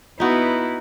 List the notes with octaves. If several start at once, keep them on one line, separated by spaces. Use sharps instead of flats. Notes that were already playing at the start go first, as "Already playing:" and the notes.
B3 D#4 E4 F#4